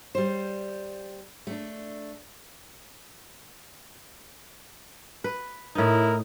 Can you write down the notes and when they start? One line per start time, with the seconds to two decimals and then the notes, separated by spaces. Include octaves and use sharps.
0.15 G3 C5
1.47 A3 D4
5.24 B4
5.75 A2 D#4 E4 A#4